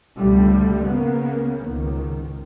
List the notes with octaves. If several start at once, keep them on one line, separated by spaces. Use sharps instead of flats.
C#2 B2 D3 F3 G3 A3
C#3 A#3 B3
C#2 G#2 D#3